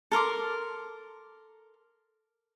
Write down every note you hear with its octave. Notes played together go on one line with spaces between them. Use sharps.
A4 A#4 C6 D6